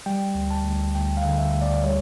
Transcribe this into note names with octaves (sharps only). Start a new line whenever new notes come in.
G3 G5
D2
A5
D2
D2 G5
F5
D3
E5
D2
D5
G3 C#5